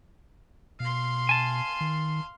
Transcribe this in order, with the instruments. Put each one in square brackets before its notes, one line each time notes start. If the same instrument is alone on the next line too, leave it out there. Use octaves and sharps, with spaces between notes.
[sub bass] B2 [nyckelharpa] F5 C6
[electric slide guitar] G#5 A5
[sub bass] D#3